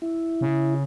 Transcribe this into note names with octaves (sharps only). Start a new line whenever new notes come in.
E4
C#3